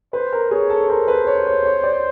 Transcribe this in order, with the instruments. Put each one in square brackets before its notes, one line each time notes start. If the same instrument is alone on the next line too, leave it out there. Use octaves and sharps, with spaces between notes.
[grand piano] B4 [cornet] C5
[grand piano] A#4
[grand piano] G#4 [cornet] C#5
[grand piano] A4
[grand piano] A#4 [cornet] C5
[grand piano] B4
C#5
C#5
C#5
D5